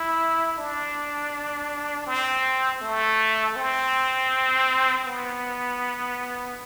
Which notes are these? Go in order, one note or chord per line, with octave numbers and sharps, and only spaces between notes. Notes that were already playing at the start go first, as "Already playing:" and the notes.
Already playing: E4
D4
C4
A3
C4
B3